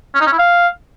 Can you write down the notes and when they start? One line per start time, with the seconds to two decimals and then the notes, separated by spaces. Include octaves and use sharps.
0.15 C#4
0.21 D#4
0.27 C#4
0.33 E4
0.39 F5